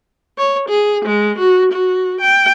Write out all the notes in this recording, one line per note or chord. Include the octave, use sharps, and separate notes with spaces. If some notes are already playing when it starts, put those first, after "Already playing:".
C#5
G#4
G#3
F#4
F#4
G5